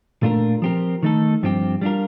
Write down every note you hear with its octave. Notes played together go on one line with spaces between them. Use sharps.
A#2 A3 D4 F4 A#4
F3 C4 G4 A#4
D#3 A3 D#4 A4
G2 F3 C4 G4
G3 D4 F4 A#4